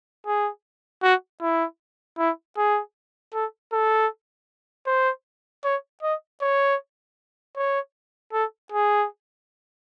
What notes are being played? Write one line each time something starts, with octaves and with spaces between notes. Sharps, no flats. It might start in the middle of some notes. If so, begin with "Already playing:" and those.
G#4
F#4
E4
E4
G#4
A4
A4
C5
C#5
D#5
C#5
C#5
A4
G#4